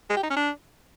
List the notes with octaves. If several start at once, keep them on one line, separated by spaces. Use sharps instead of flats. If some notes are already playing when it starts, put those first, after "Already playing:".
G#3
G4
D#4
C#4
D4